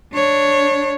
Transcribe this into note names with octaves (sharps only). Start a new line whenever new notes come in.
D4 C#5